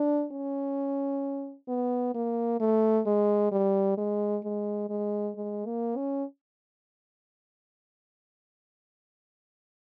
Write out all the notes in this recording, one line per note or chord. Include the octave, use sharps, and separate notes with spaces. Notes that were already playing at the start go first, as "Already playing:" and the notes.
Already playing: D4
C#4
B3
A#3
A3
G#3
G3
G#3
G#3
G#3
G#3
A#3
C#4